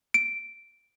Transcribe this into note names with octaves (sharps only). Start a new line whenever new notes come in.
D7